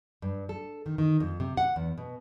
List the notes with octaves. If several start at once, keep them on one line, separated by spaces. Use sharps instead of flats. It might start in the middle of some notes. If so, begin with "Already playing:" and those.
G2
A4
D#3
D#3
F2
C3
F#5
E2
B2